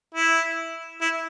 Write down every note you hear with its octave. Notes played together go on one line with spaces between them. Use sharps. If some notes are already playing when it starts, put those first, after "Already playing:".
E4
E4